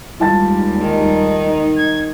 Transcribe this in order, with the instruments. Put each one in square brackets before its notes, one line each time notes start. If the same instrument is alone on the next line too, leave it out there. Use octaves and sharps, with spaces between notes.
[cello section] D#2 G3 G#3 [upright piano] F4 A5 A6
[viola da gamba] D#3 D#4
[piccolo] G#6